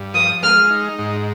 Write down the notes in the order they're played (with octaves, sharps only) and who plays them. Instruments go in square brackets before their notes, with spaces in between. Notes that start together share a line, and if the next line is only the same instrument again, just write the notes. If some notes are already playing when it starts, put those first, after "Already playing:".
Already playing: [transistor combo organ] G2
[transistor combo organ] F3 [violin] D#6
[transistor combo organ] G#3 [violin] F6
[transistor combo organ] D#4
G#2